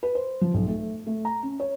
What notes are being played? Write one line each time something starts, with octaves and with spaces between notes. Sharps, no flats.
B4
C5
F3
B1
A3
A3
A#5
C#4
C#5